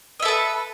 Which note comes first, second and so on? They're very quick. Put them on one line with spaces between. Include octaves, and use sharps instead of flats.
D#5 E5 A4 B4